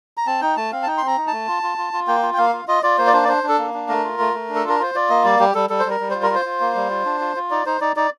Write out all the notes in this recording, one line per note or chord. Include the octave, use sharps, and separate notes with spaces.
A#5
C4 A5
D#4 G5
A3 A5
C4 F5
A5
D#4 G5
C4 C6
A#5
D#4
A3 A5
F4
F4
F4
F4
A#3 G5
F4
G5
A#3 F5
F4
F4 D#5
F4 D5
A#3 C5
D5
D4 C5
D5
D4 C5
D4
A4
A#3
D4
A3 A#4
F4
A3
A3
D4
A4
F4 A#4
F4 C5
F4 D5
A#3 D#5
G3 D5
G3 G4
G3 A4
G3 A4
C5
G3 A#4
G3
F4 C5
A#4
F4 C5
F4
A#3
G3
F4
D4
F4
F4
D#4 D5
D#4 C5
D#4 D5
D#4 D5